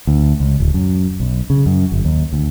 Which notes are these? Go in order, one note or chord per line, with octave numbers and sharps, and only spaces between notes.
D2
C#2
D1
F#2
B1
C#3
F#2
G1
D#2
D2